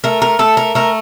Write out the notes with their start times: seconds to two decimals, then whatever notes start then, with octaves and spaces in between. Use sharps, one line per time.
0.04 A3 A#4
0.22 A#4
0.39 A3 A4
0.57 A#4
0.75 A3 A#4